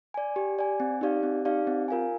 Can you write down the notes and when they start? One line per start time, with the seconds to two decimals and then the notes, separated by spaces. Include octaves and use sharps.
0.14 D5 G#5
0.36 G4
0.59 D5 G#5
0.80 C4
1.01 D#4 G4 D5 F5
1.23 C4
1.45 D#4 G4 D5 F5
1.67 C4
1.88 F4 A#4 F5 G#5